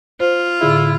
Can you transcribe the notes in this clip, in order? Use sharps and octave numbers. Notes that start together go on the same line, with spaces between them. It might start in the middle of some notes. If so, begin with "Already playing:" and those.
F4 C5
A2 D3 E4 G#4